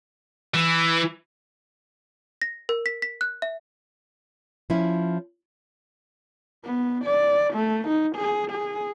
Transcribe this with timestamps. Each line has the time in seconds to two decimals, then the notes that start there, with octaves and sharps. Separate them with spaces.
0.55 E3
2.42 A#6
2.69 A#4
2.86 B6
3.02 B6
3.21 F#6
3.42 E5
4.70 F3 C#4 E4
6.64 B3
7.04 D5
7.54 A3
7.87 D#4
8.16 G#4
8.51 G#4